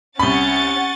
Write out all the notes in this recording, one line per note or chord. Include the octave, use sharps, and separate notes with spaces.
C2 C#4 F#5 B5 C#6 A6 G7